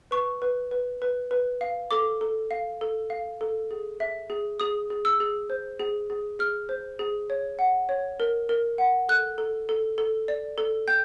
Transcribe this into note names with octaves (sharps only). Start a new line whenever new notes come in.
B4 C#6
B4
B4
B4
B4
F5
A4 D6
A4
F5
A4
F5
A4
G#4
E5
G#4
G#4 D#6
G#4
E6
G#4
C5
G#4
G#4
G#4 F6
C5
G#4
C#5
F#5
C#5
A#4
A#4
F#5
A4 F#6
A4
A4
A4
D5
A4
G5 G6